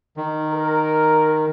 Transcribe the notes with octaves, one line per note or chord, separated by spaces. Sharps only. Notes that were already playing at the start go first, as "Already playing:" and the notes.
D#3
A#4